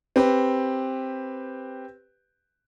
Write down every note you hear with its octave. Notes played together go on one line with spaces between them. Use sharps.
C4 G4 B4